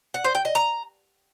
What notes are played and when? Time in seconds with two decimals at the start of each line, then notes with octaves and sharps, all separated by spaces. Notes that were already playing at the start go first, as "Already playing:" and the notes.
0.14 F#5
0.24 C5
0.35 G5
0.45 D#5
0.55 A#5